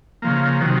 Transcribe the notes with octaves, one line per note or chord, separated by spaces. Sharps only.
C#3 F3 A#3
C3 D#3 F#3